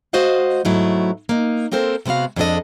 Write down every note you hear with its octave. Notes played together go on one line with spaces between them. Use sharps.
G#3 F#4 C5 D#5 F5 F#5
G#2 B2 F#3 A3 E4
A#3 D#4
A#3 C4 A4 A#4 C5
C3 G#3 B3 F#4 F5
F2 G#3 D4 D#4 A4 D#5